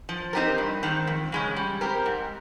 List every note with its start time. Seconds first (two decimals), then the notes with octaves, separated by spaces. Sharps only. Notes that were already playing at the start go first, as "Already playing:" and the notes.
0.09 F3
0.33 C4 D#4 G4 A#4
0.58 G2
0.83 D#3 G#3 C4
1.07 F2
1.32 C#3 G#3 C#4
1.56 G3
1.81 C4 G4 A#4
2.06 G#2